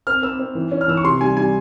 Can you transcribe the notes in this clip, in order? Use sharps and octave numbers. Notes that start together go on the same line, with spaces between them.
C4 F6
C4 E6
C4
E3
C#4
F6
E3 E6
C#6
C3 C6
G3 G#5
G3 G#5